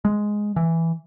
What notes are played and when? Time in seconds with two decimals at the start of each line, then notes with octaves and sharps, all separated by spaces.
0.05 G#3
0.56 E3